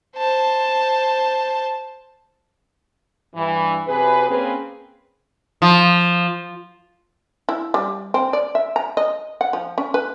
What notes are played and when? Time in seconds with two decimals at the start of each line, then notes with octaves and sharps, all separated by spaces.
0.17 C5 A5
3.35 G2 E3
3.88 F#2 C3 G#4 B4
4.29 A#3 C4 C#4 G#4 B4
5.62 F3
7.49 E4
7.74 G3
8.14 C4
8.33 D5
8.55 E5
8.76 A#5
8.97 D#5
9.41 F#5
9.53 F3
9.78 C#4
9.94 B4